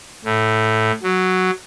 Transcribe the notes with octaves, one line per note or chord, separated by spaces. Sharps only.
A2
F#3